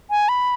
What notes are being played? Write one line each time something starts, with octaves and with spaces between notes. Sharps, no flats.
G#5
B5